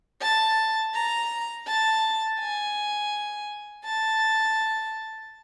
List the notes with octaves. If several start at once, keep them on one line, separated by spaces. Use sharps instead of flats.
A5
A#5
A5
G#5
A5